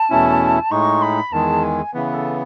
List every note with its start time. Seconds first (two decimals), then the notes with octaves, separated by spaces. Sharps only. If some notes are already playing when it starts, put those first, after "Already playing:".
Already playing: A5
0.10 E2 B2 A3 C#4 E4
0.71 A2 G#3 D#4 C#6
1.02 B5
1.32 E2 D#3 G#3 A5
1.64 G#5
1.94 C#3 E3 B3 B4
2.14 A4